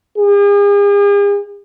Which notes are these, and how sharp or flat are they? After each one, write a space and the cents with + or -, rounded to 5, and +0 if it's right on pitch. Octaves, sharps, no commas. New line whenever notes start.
G#4 -45